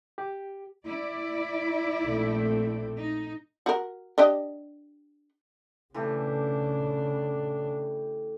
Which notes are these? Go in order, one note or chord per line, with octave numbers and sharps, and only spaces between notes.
G4
E4 D5
A#1 A3 C4
D#4
F#4 A#4
D4 G4 D#5
C#3 E3 A3 D4 G4